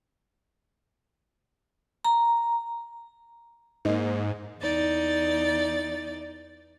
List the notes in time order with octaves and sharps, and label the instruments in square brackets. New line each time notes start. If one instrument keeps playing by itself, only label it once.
[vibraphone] A#5
[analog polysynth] G#2 [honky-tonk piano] A#3 D#4
[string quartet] E2 D#4 D5 A6